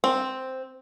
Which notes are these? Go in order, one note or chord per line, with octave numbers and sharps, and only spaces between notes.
C4